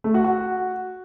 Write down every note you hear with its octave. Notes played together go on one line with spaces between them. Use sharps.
A3
F#4
F#4